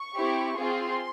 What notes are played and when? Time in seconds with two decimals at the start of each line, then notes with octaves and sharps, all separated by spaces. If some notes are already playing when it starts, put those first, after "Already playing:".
Already playing: C#6
0.14 C4 E4 G4
0.56 C4 F4 G#4 C6